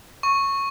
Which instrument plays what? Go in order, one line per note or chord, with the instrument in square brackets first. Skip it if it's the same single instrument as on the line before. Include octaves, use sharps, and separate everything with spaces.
[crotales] C#6